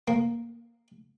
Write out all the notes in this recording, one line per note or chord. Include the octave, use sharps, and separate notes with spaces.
A#3